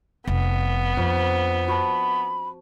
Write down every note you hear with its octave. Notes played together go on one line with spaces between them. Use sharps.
F1 B3
F2 D4
F#4 A5 B5